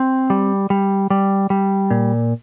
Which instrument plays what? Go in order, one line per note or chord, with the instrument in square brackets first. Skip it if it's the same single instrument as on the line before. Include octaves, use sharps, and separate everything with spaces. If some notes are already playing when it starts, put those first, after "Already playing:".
Already playing: [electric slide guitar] C4
G3
G3
G3
G3
A#2